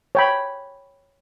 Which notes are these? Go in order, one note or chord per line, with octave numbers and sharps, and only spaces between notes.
C#5 G5 B5